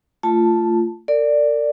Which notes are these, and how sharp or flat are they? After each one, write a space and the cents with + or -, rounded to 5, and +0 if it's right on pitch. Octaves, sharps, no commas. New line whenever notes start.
A3 +20 F4 -15 A5 +0
A#4 -40 D5 +0